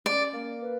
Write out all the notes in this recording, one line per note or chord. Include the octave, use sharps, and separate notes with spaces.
C#4 D5
A#3
B4